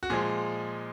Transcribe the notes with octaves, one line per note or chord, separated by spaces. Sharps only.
F#4
A#2 F3 G#3 G#4